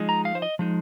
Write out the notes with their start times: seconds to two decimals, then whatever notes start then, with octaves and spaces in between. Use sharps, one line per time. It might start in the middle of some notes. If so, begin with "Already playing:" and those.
Already playing: F3 G#3 D#4
0.09 A#5
0.25 F5
0.35 C5
0.42 D#5
0.59 F3 G#3 D#4